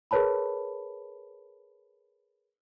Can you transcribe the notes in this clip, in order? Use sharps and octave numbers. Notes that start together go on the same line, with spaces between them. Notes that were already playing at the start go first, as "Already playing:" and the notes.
G#4 A#4 B4 C#5 A5 B5